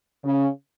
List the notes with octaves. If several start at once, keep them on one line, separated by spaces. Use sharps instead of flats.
C#3